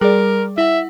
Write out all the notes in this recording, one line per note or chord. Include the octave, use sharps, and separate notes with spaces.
G3 G#4 A#4 D5
E4 E5 F#5